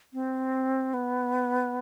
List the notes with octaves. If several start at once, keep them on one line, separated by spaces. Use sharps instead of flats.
C4
B3